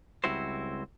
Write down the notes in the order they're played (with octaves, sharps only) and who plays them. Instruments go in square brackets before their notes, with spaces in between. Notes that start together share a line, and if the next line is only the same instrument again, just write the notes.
[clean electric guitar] C#2 G3 C4 E4 F#4 C5